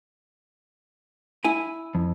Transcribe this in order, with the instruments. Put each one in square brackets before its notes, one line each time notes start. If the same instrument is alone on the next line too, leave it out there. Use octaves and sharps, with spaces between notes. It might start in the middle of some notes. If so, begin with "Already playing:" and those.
[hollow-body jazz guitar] E4 G#5
[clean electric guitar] F2